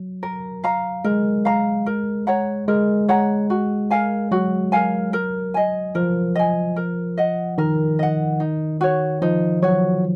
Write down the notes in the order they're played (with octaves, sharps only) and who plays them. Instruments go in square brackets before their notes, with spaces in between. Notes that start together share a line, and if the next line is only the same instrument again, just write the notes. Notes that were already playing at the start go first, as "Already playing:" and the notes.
Already playing: [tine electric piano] F#3
[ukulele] A#4
F5 A#5
[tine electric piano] G#3 [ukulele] A#4
[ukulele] F5 A#5
A#4
C#5 F#5 A#5
[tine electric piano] G#3 [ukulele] A#4
[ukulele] C#5 F#5 A#5
F#4
A#4 F5 G#5
[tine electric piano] F#3 [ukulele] F#4
[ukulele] A#4 F5 G#5
A#4
D#5 G#5
[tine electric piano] F3 [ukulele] A#4
[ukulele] D#5 G#5
A#4
D#5 F#5
[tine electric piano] D#3 [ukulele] A#4
[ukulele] D#5 F#5
D#4
F#4 C#5
[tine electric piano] F3 [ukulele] D#4
[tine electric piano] F#3 [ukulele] F#4 C#5